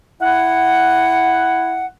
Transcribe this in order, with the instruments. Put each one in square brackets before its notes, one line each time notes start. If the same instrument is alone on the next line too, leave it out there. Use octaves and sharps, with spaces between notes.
[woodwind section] E4 F#5